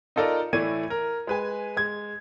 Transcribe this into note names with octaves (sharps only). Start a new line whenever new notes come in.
D#4 F4 A4 A#4 D5
A2 E3 A3 D5 G#6 D#7
A#4
G#3 B4 G#5
G#3 G#6